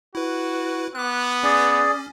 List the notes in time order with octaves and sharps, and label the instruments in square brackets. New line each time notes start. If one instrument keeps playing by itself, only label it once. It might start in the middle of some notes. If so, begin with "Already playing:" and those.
[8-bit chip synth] E4 B4 [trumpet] F#4
[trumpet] B3 [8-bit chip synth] D6 F#6
[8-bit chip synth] C#4 [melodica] G#4 D5